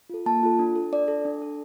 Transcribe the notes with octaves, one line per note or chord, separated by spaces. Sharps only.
F4 A4
A#3 A5
F4 A4
D4
A4
D4 D5
A4
D4
A4